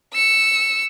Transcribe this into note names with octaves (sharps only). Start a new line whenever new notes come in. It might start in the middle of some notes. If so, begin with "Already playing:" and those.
E6 C#7